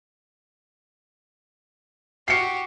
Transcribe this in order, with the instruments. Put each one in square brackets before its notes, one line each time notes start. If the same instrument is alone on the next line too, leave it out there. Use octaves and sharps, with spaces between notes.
[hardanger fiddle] F#4 G4 [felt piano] C7 C#7